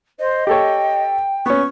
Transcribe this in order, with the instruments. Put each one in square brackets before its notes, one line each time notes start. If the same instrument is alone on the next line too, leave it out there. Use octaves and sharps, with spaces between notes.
[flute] C5 [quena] D#5
[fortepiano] G4 A4 C#5 [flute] G5
[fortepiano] B3 C#4 [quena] C#6